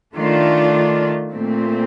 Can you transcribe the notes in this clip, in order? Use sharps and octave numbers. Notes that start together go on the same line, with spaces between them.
D#3 A3 D4 F4
A#2 A3 C4